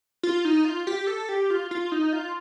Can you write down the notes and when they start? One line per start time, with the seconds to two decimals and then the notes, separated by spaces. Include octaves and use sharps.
0.23 F4
0.45 D#4
0.65 F4
0.87 G4
1.07 A4
1.29 G4
1.50 F4
1.71 F4
1.92 D#4
2.13 F4